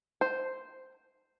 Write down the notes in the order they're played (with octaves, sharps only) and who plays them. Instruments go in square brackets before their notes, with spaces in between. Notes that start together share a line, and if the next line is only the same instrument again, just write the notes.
[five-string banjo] C5